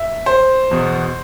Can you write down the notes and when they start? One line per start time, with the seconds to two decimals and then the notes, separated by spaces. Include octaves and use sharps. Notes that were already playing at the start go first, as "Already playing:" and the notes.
Already playing: E5
0.26 C5
0.71 E2 B2 B3